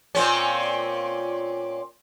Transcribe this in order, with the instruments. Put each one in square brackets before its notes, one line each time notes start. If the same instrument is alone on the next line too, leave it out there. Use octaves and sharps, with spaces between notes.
[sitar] A#2 C4 C#4